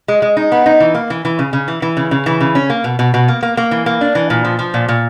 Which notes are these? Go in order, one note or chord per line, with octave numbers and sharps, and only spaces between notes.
G#3
G#3
D#4
B3
D#4
E3
A#3
E3
E3
C#3
C#3
E3
E3
C#3
C#3
E3
C#3
C#4
A#3
B2
B2
B2
A#3
A#3
A#3
E3
A#3
D4
E3
A#2
F3
F3
A#2
A#2